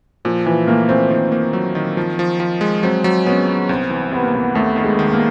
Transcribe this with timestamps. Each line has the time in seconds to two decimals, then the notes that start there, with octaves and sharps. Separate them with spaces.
0.25 A#2 F3
0.46 A#2 E3
0.67 A3 A#3
0.89 A3 C4
1.11 D#3
1.32 A#3
1.53 F#3
1.75 D#3
1.97 F3
2.19 F3
2.40 F3
2.61 G#3
2.83 F#3 C4
3.04 F#3
3.26 B3 C#4
3.48 B3
3.69 C2 C4
3.90 E3
4.11 C3 B3
4.23 A#3
4.34 C2 B3
4.55 D#2 A3
4.76 D#3
4.84 G#3
4.99 D#3
5.13 A#3